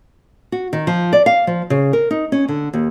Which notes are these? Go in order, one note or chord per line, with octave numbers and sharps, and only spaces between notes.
F#4
D#3
F3
D5
F5
F3
C#3
A#4
D#4
C#4
D3
D#2